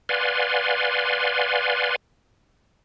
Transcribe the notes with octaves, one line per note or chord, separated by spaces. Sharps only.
B4 D5 F5 F#5 G#5 C6